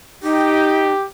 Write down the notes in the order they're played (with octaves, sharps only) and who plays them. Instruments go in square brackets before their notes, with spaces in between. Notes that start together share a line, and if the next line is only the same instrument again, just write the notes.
[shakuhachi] D#4 [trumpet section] G4